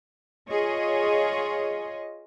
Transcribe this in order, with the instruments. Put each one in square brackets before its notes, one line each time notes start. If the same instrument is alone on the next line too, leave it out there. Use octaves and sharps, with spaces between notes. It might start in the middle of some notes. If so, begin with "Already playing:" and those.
[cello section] F4 G#4 C#5 D#5